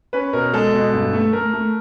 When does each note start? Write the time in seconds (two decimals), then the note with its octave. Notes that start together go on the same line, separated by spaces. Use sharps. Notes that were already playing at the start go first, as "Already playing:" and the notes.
0.13 C#4 B4
0.33 B2 A#4
0.53 G#3 A4
0.73 B2
0.93 G2
1.13 A3
1.33 A3 A#4
1.53 A3